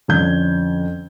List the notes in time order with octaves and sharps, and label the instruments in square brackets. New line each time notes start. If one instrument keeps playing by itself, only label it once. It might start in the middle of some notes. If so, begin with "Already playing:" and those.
[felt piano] F2 D3 C#4 G6 G#6